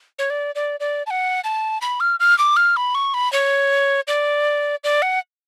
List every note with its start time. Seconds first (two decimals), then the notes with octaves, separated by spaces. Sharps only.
0.19 C#5
0.30 D5
0.55 D5
0.80 D5
1.07 A5
1.11 F#5
1.44 A5
1.81 B5
2.00 F6
2.20 F6
2.39 D6
2.56 F6
2.77 B5
2.95 C#6
3.14 B5
3.33 C#5
4.08 D5
4.84 D5
5.02 F#5